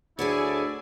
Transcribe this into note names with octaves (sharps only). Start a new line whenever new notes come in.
D2 E4 G#4 A4 C#5 D5 G#5